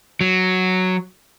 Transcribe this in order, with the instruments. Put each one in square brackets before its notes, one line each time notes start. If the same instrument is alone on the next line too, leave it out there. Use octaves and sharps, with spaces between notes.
[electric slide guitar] F#3